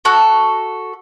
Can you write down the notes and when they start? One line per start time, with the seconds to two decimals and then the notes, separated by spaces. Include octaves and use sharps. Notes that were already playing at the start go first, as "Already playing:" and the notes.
0.05 F#4 A4 F#6